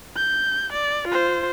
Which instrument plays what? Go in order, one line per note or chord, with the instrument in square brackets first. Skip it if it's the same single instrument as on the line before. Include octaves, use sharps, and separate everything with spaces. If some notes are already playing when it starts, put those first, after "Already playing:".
[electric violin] G6
D5
F4 C5